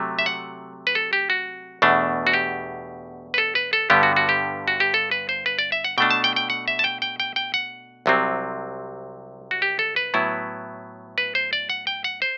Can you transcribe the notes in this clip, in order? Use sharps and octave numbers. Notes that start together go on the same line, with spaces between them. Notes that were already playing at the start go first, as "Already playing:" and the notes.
Already playing: C3 F#3 A3
E5
F#5
B4
A4
G4
F#4
E2 B2 A3 D4
F#4
G4
B4
A4
B4
A4
G2 D3 G3 B3 G4
F#4
F#4
G4
F#4
G4
A4
B4
C5
B4
D5
E5
F#5
B2 A3 D4 G5
A5
G5
G5
F#5
E5
A5
G5
G5
G5
G5
F#5
C2 C3 F#3 C4
F#4
G4
A4
B4
A2 F#3 B3 E4
B4
C5
D5
F#5
G5
F#5
C5